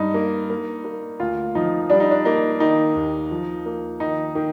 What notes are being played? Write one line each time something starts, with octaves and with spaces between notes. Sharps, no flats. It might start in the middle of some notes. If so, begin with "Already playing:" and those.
Already playing: G2 D#4
A#3
A#3
A#3
D2 F4
F3 D#4
G3 D4
D#4
D4
A#3 D#4
D#3 D#4
D#2
F3
A#3
D#3 D#4
D#3